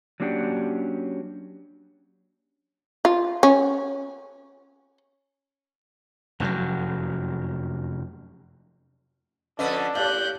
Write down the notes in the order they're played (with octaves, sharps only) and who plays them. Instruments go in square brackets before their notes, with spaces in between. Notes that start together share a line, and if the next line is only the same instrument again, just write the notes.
[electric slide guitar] F#3 A#3 C#4 D4 G4 F#5
[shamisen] F4
C#4
[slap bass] F1 F#2 A#2 F#3
[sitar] F2 D3 B4 [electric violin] C#4 A4 [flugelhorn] D4 [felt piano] D#5
[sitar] A2 [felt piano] G4 D5 F5 [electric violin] F#6 G6